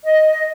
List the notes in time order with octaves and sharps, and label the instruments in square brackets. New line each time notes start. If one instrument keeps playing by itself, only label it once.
[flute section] D#5